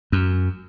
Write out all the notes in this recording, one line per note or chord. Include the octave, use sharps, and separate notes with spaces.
F#2